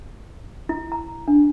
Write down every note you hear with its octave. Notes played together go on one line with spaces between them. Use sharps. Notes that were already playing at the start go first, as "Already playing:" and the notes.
E4
A#5
D4